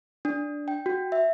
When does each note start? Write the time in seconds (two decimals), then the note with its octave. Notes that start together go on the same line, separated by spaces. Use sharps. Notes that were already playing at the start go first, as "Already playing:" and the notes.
0.25 D4
0.68 G5
0.86 F#4
1.12 E5